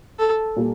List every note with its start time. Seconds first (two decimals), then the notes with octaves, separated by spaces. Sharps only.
0.19 A4
0.56 A#2 G3 A#3